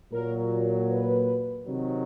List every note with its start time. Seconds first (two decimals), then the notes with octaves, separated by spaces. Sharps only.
0.12 A#2 F#3 A#4
0.90 B4
1.67 C3 D#3 F#3